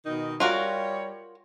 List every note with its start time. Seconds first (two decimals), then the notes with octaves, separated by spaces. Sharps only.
0.06 B2 D#3 D#4
0.40 G3 F4 F#4 A#4 C#5